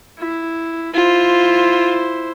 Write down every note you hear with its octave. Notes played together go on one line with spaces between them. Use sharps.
E4
E4 F4 C5